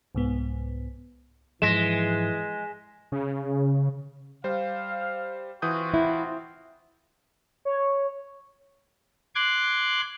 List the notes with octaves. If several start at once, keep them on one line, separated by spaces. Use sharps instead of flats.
C2 G#2 B3
G#2 E3 F3 G#3 A#6 B6 E7
C#3
G3 C5 F5
E3 C4 F4 F#4 D#6 G6
E4
C#5
C6 D6 F#6 G#6